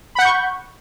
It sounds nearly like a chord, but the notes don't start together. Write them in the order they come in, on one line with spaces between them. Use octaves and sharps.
B5 F#5 G6 C#6